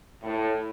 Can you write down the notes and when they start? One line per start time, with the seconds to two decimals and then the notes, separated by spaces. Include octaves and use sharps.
0.23 A2